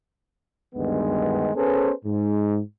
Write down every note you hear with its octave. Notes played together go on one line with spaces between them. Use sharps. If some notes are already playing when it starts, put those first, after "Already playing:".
D2 G2 D#3 G#3 B3
B3 C#4 G#4 A4 B4 C5
G#2